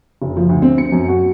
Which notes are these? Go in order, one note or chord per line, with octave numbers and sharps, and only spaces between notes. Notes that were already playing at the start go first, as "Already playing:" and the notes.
F#1
F3
D2
C4
C#7
F#2
F#4